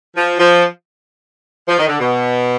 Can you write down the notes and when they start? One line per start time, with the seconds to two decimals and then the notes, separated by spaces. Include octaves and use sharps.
0.16 F3
0.40 F3
1.68 F3
1.79 D#3
1.88 D3
1.99 B2